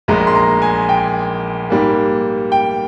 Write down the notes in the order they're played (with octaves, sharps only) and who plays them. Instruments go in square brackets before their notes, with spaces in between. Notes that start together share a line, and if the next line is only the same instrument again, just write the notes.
[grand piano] A#1 A#2 G#3 A#5
C6
A#5
G#5
G5
G#2 G3 A#3
G5